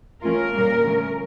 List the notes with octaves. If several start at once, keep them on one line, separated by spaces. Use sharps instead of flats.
F3 A3 C#4 F4 A#4
A#2 G3 A#3
D3 F3 A3 C#4